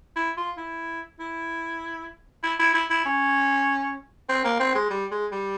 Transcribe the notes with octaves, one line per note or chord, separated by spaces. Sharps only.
E4
F4
E4
E4
E4
E4
E4
E4
C#4
C4
A#3
C4
G#3
G3
G#3
G3